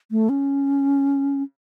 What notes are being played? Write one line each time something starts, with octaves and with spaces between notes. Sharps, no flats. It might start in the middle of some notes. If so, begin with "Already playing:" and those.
A3
C#4